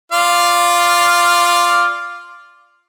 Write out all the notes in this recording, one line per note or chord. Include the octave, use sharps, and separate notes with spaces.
F4 D5 F5